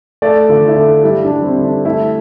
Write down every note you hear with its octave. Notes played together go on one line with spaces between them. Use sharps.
A3 D5
D3 F4
E4
D3 D4
G3 E4
D4
G3
C4
D3
D4
A3 E4